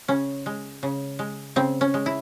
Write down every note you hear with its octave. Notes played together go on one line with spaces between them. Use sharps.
C#3 C#4
G#3
C#3
G#3
C#3 C4
C#4
G#3
E4